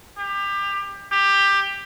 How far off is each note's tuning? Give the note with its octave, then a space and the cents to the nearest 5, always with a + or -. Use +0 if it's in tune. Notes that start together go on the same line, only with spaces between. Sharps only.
G4 +25
G4 +15